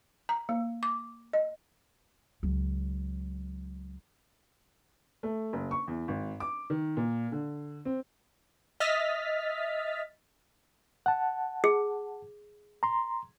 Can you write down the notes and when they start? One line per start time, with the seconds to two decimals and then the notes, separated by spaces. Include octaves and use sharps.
0.29 A#5
0.49 A#3
0.83 D6
1.33 D#5
2.43 C#2 F#3
5.23 A3
5.53 F#1
5.71 C#6
5.88 E2
6.08 G#1
6.40 D6
6.70 D#3
6.97 A#2
7.32 D3
7.85 C4
8.80 D#5 E5 F6 A6 B6
11.06 F#5 A5
11.64 G#4
12.83 A#5 C6